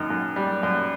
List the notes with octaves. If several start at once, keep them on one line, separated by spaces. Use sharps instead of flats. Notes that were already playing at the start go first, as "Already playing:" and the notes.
Already playing: F#2 D#3
F#2
G3
F#2